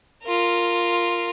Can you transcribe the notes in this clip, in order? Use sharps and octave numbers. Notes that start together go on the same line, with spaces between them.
F4 A#4